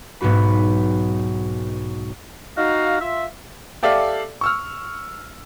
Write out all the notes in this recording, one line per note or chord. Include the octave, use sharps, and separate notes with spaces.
B1 G#2 B3 F#4 B5
D#4 F#4 F5
F4 E5
G4 A4 D5 E5 F5
C#6 E6 F6